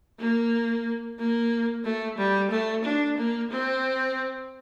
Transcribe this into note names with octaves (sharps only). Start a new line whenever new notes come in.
A#3
A#3
A3
G3
A3
D4
A#3
C4